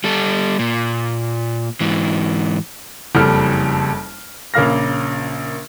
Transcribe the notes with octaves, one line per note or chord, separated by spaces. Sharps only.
G3 A4
A#2
G#2 E3
F#1 F2 G3 A4 F6
A#1 C#3 A#3 F5 F6 A#6